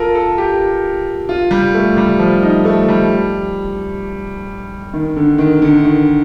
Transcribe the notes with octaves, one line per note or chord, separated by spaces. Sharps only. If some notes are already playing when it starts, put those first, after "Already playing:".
Already playing: F4 A4 A#4
A4
G4
F4
G3
A3
G3
F3
D#4
A3
G3
D#3
D3
D#3
D3
D#3